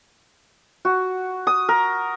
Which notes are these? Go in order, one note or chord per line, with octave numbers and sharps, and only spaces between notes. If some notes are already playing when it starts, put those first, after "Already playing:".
F#4
D#6
A#4